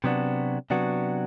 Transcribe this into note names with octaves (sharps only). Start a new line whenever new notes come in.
C3 F#3 B3 D4 F#4
C3 F#3 B3 D4 F#4